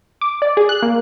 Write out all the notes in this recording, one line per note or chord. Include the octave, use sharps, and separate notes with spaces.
D6
D5
G#4
F#6
A#3